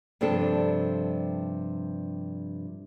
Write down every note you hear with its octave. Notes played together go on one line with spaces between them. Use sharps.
G2 C3 F3 D4 A4